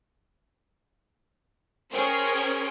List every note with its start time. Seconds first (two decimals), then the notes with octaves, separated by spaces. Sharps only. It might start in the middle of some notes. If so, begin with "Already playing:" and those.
1.93 C#4 G#4 A#4 C5 G5